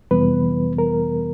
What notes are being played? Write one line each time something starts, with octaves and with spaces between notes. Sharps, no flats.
F2 C3 E3 G3 B3 B4
A#4